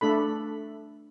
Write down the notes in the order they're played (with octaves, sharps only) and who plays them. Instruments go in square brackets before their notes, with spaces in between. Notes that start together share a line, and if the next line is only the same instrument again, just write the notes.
[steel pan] A3 D4 A4 B5